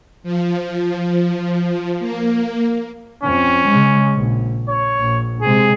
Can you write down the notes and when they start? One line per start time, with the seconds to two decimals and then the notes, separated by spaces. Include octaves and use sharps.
0.23 F3
2.00 A#3
3.23 F2 C#4
3.67 C#3 G#3
4.15 A#1
4.69 C#5
4.99 A#1
5.42 C3 G#3 G#4